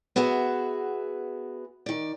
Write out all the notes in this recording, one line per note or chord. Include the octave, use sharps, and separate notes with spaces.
B3 F#4 G#4 E5
D#3 D5